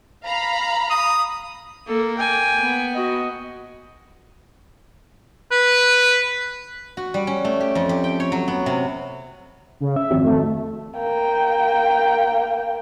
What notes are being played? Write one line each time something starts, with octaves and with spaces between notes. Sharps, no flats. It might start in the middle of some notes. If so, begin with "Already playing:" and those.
F5 A#5 B5
D#6
A#3 A4
G5 G#5
B3
F#4 D#5
B4
F#4
G3
C#4
A3
G4
F2
G4
G5
C#5
F#3
B3
C3
C#3
E5
G#1 F2
A3
A#3 G5